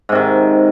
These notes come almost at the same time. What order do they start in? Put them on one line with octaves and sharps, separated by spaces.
G#2 C3 D#3